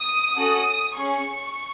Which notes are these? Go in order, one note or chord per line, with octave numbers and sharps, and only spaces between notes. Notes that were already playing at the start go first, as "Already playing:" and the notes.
Already playing: D#6
C#4 F#4 A4
C#4 G#4 C#6